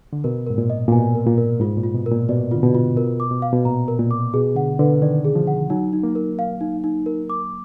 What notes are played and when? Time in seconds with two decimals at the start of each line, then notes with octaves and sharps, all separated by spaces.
0.13 D3
0.24 B2 A#4
0.47 G#2 A#4
0.58 A#2
0.70 D#5
0.88 A#2
0.92 B2 G#5
1.15 A#4
1.27 A#2
1.38 A#4
1.60 G#2 F4
1.77 A#2
1.83 F4
1.94 B2
2.06 A#4
2.11 A#2
2.29 B2 D5
2.51 D3 F4
2.63 B2
2.75 F4
2.96 B2 A#4
3.20 D6
3.31 B2
3.42 F5
3.53 B2
3.65 A#2 A#5
3.88 A#4
4.00 A#2
4.11 D6
4.33 B2 G#4
4.56 D3 F#5
4.79 D3 B4
5.02 D#3 D5
5.24 G#4
5.35 F3
5.47 F#5
5.70 F#3 D#4
5.93 D#4
6.03 A#3
6.15 A#4
6.39 F5
6.61 D#4
6.84 D#4
7.06 A#4
7.30 D6